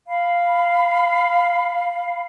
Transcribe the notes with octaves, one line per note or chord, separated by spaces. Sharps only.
F5 B5